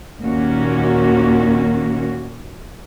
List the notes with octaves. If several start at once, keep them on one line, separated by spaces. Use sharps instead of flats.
D#2 A#2 D#3 A#3 C#4 F#4